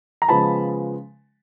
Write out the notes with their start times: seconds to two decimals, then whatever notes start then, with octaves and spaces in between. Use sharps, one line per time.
0.22 A#5
0.28 C#3 F3 G#3 B3 A5 B5